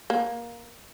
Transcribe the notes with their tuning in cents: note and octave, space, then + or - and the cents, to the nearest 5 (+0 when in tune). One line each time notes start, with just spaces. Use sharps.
A#3 +15